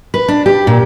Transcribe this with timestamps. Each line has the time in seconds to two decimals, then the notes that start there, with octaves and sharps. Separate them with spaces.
0.14 B4
0.28 D4
0.46 G4
0.67 A#2